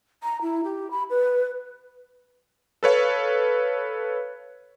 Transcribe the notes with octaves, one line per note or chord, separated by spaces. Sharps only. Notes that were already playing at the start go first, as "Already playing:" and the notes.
A#5
E4
G4
B5
B4
A4 B4 C#5 F5